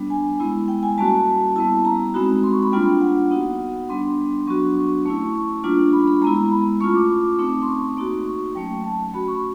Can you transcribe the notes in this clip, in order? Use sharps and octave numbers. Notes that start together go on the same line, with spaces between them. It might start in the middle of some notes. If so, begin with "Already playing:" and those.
Already playing: G3 B3 D4
G#5
G#3 B3 E4
G5
G#5
G3 A#3 C#4 F#4 A5
G3 B3 E4 A5
A#5
G#3 C4 D#4 F#4 B5
C6
C#6
B5
G3 A#3 D4 F4 G5
F#5
B3 D#4 F#4
G3 B3 D4 C6
F#3 B3 D4 F#4 C#6
C#6
A3 C#4 E4 C#6
C#6
C#6
G3 A#3 D4 F4
B5
B5
G#3 B3 E4 A#5
A#5
B5
A3 C#4 F4 C#6
D6
A3 C4 D#4
C6
C#6
A#3 D#4 F#4
C#6
F#3 A3 C#4 G5
A5
A3 C#4 F#4 B5
C#6